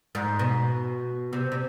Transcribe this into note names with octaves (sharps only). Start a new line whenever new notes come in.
G#2
B2
C3
C3